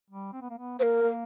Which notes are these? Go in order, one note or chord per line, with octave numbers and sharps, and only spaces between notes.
G3
C4
B3
A#3
B3
A#3 A#4 C5
A#3